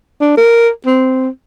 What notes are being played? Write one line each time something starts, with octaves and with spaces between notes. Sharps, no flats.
D4
A#4
C4